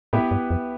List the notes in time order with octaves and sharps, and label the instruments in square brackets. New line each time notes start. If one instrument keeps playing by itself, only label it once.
[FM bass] A2 [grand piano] B3 E4 G4 B4 E5
[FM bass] G2
F2